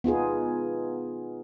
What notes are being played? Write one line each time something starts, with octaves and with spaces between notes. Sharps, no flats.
B3 D#4 F4 G#4